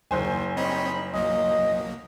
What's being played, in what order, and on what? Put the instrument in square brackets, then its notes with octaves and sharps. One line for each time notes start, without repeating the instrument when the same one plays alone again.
[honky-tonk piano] F#1 C5 G#5 [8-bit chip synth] D#2
[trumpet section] G3 D#4 B5 [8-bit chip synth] C4 C#5 D#5
[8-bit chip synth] B1 F#3 A#3 [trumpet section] D#5